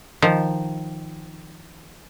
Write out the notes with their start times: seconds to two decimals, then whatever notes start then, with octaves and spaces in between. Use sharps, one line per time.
0.22 D#3 F3